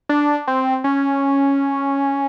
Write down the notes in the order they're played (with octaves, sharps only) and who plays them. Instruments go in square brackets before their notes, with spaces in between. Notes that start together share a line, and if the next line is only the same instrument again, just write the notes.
[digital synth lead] D4
C4
C#4